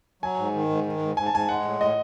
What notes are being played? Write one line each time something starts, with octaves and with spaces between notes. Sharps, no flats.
F#3 G#5
G#2
D#3
G#2
D#3
G#2
G#2 G#5
A5
G#2 G#5
G#3 F#5
A2
A2 D#5